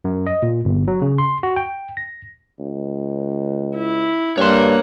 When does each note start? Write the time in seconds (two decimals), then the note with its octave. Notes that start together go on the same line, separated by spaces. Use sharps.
0.04 F#2
0.27 D#5
0.42 A#2
0.65 G1
0.88 F#3
1.02 C#3
1.18 C6
1.43 F#4
1.56 G5
1.97 A#6
2.60 C#2
3.76 E4
4.38 G2 A#3 C#5 F#5 C6